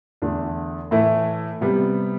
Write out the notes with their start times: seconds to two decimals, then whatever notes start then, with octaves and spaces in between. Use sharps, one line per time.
0.22 E2 D3 A3 D4
0.91 A2 E3 A3 E4
1.61 C3 G3 B3